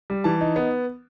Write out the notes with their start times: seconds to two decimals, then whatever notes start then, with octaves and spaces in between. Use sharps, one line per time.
0.10 G3
0.24 E3 A5
0.41 D#4
0.56 B3